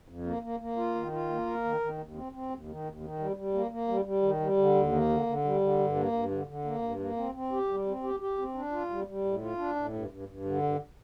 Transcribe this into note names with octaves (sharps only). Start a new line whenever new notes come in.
F2
A#3
A#3
A#3
F4
D#3
F4
A#3
A#4
D#3
D#3
D#2
C4
C4
D#2
D#3
D#2
D#3
G3
G3
A#3
A#3
G3
G3
D#3
G3
D3
D#2
A#3
D3
D3
G3
D3
G2
A#3
G2
D3
D3
A#3
G2
A#3
C4
C4
G4
G3
C4
G4
G4
C4
D4
F4
G3
G3
A2
F4
D4
A2
G2
G2
G2
D3
G2